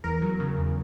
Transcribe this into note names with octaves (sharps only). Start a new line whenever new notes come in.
E2 A#4
F#3
C#3
E2